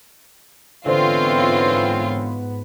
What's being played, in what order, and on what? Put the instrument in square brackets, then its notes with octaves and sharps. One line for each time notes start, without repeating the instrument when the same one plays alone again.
[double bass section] G#2 B3 [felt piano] D3 C5 [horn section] E3 C4 [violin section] F4 C#5